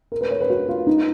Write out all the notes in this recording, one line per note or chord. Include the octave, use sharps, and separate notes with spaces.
A#4
B4
C#5
B4
F#4
F4
D#4